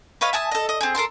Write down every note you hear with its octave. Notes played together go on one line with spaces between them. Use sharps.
B4 C#5 D#5 F5
E5 G#5 A5 D#6
A4 D#5
D#5
C4 G#4
A4 A#4 A5 C6